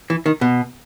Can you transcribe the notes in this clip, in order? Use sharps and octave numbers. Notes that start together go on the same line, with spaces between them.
E3
D#3
B2